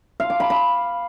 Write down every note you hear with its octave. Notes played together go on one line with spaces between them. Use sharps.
F5
D6
B5
B5